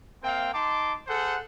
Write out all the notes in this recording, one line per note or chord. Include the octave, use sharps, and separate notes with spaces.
A#3 C4 E5 F5 G5
D#4 A5 C6 D6
G#4 A4 C5 F#5